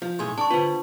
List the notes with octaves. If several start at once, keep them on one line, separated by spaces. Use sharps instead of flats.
F3
B1 A2 G#4 C6
D4 A5 C#6
D3 B3 F4 C5